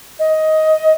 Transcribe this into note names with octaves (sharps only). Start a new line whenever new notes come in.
D#5